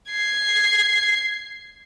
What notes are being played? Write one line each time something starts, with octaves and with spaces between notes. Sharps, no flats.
G#6 C7